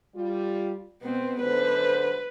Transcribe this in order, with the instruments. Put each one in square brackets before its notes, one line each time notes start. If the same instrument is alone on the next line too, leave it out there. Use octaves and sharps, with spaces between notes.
[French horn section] G3 F4
[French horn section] B2 [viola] B3 C4
[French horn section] F#2 D3 C5 [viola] B4